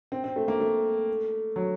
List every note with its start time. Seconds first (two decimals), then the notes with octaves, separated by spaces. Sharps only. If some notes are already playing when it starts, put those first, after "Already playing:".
0.12 C4
0.24 C4
0.36 A3
0.48 A#3
0.60 A3
1.56 F#3